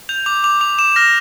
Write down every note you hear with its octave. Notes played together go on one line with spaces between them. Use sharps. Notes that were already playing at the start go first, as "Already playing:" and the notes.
G6 F7
D6 F7
D6 F7
D6 F7
D6 E7
F6 A#6